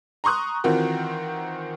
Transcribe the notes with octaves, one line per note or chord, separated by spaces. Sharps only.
A#5 C6 C#6 D#6 F#6
D#3 E3 C4 F4 F#4 A#4